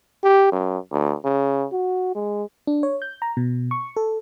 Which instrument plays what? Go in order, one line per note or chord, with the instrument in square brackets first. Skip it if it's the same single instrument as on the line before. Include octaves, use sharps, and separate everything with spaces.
[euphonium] G4
F#2
D2
C#3
F#4
G#3
[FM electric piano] D4
C#5
G6
A#5
B2
C#6
A4